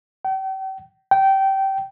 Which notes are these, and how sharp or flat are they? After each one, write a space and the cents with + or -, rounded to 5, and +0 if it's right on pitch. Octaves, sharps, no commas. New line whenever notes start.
G5 -40
G5 -20